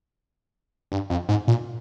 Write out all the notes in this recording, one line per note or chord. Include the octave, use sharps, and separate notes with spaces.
G2
F2
G#2
A#2